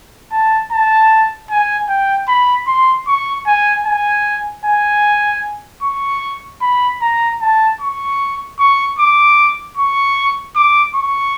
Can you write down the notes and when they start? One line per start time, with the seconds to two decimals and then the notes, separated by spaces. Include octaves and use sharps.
0.32 A5
0.71 A5
1.50 G#5
1.89 G5
2.28 B5
2.67 C6
3.07 C#6
3.47 G#5
3.86 G#5
4.65 G#5
5.83 C#6
6.61 B5
7.01 A#5
7.41 A5
7.81 C#6
8.59 C#6
8.99 D6
9.77 C#6
10.56 D6
10.95 C#6